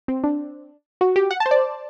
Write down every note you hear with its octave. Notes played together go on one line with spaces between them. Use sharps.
C4
D4
F#4
G4
F#5
A5
C5
D5